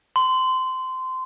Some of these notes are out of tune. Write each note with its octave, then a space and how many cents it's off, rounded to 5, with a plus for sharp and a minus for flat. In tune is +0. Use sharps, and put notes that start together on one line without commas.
C6 -20